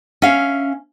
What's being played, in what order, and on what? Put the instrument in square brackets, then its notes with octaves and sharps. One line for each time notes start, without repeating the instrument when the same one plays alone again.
[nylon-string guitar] C#4 E5 F5